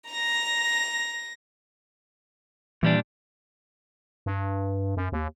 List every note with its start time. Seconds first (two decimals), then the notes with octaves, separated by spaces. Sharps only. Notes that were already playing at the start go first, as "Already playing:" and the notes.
0.11 A#5 A#6
2.83 A#2 E3 G3 D4
4.26 G2
4.97 F#2
5.12 D#2